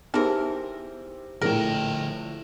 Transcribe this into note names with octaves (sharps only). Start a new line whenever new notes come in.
E3 B3 D#4 G4 G#4 A#4 C5 E5
A#1 A2 D3 G#4 A#4 G5